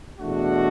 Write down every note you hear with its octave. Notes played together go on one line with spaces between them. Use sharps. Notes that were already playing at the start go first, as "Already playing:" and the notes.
E2 B2 A3 D4 F#4